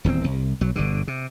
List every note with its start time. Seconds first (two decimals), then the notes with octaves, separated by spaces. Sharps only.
0.04 D#1 E2 F3 C4
0.24 C2
0.61 B1 F#3
0.76 G1 B2 D3
1.07 C3